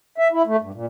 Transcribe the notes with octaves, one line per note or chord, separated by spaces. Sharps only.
E5
E4
A3
G2
A#2